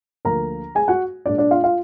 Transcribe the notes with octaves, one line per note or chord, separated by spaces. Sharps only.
D2 D3 F3 A#3 A#4 A#5
G#4 G#5
F#4 F#5
A#2 G#3 D4 D5
D4 D5
F4 F5
F4 F5